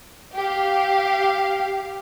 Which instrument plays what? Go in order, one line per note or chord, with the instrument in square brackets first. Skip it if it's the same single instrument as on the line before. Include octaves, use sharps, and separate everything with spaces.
[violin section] G4 F5